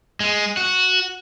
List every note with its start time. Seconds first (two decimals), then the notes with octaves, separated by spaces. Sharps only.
0.20 G#3
0.57 F#4